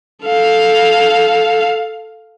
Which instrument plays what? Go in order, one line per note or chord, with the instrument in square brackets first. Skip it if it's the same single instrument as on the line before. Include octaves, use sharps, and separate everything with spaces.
[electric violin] A4 F5